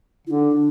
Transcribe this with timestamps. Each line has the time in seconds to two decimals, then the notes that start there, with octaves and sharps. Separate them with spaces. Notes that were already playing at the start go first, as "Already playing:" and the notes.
0.27 D3 D4 E4